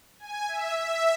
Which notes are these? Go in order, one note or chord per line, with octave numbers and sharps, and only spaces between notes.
G#5
E5
E5